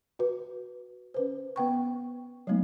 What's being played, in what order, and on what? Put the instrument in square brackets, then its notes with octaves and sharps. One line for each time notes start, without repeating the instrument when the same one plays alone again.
[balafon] F#4 B4
C#4 B4 C5
B3 B4 F#5 G5 B5 C#6
F#3 G#3 A3 B3 D#4